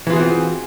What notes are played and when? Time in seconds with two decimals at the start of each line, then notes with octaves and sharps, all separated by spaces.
0.07 E3
0.10 F4
0.13 G#4
0.16 F#4
0.20 C4